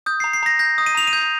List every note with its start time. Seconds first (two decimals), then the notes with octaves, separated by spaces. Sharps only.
0.06 D#6 G6
0.20 A#5 C7
0.33 C7
0.43 A#5 A#6
0.59 G6 A#6
0.78 D#6
0.86 D#7
0.95 A#5 F7
1.07 D#7
1.13 G6